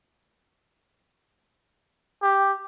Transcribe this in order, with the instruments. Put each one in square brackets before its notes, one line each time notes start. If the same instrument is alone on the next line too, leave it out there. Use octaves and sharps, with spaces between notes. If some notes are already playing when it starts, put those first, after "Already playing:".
[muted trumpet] G4